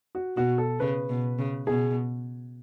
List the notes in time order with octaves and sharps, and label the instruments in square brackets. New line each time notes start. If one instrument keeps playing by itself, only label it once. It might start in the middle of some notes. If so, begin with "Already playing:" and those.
[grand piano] F#4
[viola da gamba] B2 [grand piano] F#4
[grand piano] A4
[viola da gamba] C#3 [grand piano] B4
[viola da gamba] B2
C#3
[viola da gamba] B2 [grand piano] G#4